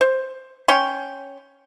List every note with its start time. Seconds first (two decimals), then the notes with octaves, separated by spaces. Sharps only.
0.01 C5
0.68 C#4 C#5 G5 C6